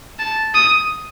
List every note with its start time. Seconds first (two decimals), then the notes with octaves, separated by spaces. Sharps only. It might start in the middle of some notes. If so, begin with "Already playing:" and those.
0.19 A5
0.55 D#6